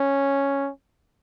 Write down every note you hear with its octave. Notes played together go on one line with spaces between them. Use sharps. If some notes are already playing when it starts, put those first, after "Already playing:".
Already playing: C#4